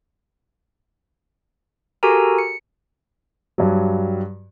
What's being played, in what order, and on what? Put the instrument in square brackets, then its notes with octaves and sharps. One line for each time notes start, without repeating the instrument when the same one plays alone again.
[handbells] F#4 G4 A4 A#4 G#5 A#5
C#7
[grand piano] G2 F#3